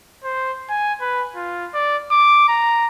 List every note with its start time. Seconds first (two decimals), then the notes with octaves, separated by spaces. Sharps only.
0.24 C5
0.70 G#5
1.01 B4
1.35 F4
1.74 D5
2.11 D6
2.48 A#5